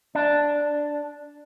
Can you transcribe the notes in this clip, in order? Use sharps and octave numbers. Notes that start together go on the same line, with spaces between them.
D4